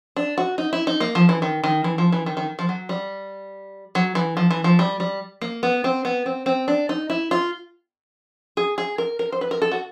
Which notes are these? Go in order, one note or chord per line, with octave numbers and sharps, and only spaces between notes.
D4
F#4
D#4
E4
D#4
A#3
F3
E3
D#3
D#3
E3
F3
E3
D#3
D#3
F3
F#3
G3
F#3
E3
F3
E3
F3
G3
G3
A#3
B3
C4
B3
C4
C4
D4
D#4
E4
F4
G#4
G#4
A#4
A#4
C5
B4
A#4
A4
F#4